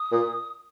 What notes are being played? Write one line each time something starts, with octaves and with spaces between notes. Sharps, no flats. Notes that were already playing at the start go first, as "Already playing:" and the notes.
Already playing: D#6
A#2